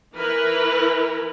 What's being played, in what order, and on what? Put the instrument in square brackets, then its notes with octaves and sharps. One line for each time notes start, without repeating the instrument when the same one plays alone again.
[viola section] E3 E4 A#4 B4